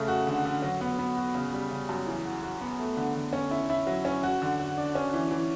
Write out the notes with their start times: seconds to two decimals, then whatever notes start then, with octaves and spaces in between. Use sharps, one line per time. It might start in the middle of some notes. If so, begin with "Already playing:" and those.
Already playing: C#3 A3
0.08 F#4
0.27 D3
0.45 D3
0.62 F#3
0.81 B3
0.99 B3
1.17 F#4
1.35 C#3
1.53 G3
1.71 C#3
1.89 F#2
2.07 E3
2.25 F#4
2.43 F#4
2.61 B3
2.79 A3
2.97 D3
3.15 D3
3.33 C#4
3.51 E4
3.70 E4
3.87 F#3
4.05 C#4
4.23 F#4
4.42 D3
4.59 F#4
4.77 D4
4.95 C#4
5.14 E3
5.31 E3